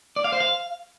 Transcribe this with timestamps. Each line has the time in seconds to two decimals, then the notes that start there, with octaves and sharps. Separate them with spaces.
0.16 D5
0.24 F5
0.32 C5
0.40 F5